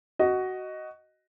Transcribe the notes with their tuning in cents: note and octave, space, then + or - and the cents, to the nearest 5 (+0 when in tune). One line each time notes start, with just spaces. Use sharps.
F#4 +10 D#5 +0